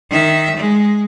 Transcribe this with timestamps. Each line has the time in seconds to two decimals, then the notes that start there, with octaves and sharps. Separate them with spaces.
0.11 D#3 E5
0.57 G#3